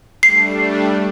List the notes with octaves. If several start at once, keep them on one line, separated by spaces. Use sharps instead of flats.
G3 A3 D4 C7